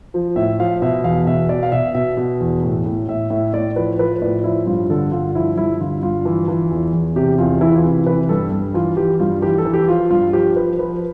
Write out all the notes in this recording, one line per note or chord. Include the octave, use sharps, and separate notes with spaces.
F3
A2 E5
F3 F5
B2 E5
E2 F5
B2 E5
B2 D5
F5
B2 E5
B2 E5
B2
E2
A2
A2
A2 E5
A2 E5
A2 D5
F3 B4
F3 B4
A2 D5
F3 E4
G2 F4
D3 A4
G2 F4
F3 E4
G2 E4
D3 F4
G2 F4
E3
E3
E2
E2
C3 G4
E2 F4
E3 E4
F4
C3
E3 B4
G2 A4
G2
E3 F4
E3 G4
G2 F4
E3 G4
A4
E3
G4
F3 F4
G2 F4
F3 G4
F3 B4
F3 B4